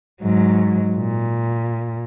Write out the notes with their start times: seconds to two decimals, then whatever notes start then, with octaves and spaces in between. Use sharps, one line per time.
0.23 G#2 F#3
0.96 A#2